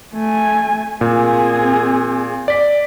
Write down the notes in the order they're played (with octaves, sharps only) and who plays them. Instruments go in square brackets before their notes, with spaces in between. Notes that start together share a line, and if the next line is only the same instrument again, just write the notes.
[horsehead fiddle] A3 G#5
[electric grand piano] A#2 [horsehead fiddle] C4 G#4
[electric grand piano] D5 B6